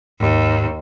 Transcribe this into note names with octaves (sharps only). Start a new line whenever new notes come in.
D#2 G#2